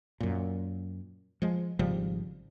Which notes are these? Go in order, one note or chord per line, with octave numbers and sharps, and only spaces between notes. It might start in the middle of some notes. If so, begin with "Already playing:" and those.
F#2 A#2
F3 G#3
G#1 C#3 F3 G3